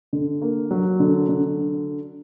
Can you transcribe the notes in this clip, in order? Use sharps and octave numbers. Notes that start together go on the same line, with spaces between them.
D3
A#3
F#3
D3
D3